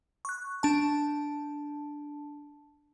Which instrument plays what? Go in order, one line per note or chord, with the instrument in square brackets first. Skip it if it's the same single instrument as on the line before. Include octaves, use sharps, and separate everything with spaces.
[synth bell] C#6 F#6
D4 A5